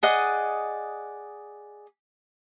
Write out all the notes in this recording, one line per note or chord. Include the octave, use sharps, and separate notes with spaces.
G#4 D5 D#5 F#5